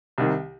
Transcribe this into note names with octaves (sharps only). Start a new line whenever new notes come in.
C2 C3 D#3